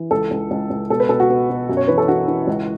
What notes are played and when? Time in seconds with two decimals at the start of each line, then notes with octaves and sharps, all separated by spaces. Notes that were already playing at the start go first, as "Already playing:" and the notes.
Already playing: E3
0.11 C#2 A4
0.31 C#2
0.51 C#2
0.70 C#2
0.90 B2 A4
1.00 B4
1.09 B2 A4
1.20 F#4
1.30 B2
1.50 B2
1.69 F#2
1.77 C#5
1.88 E3 B4
1.98 A4
2.08 E3 F#4
2.27 E3
2.47 C#2